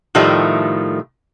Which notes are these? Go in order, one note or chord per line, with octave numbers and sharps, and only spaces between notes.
A2 D#3 F3 G3 A3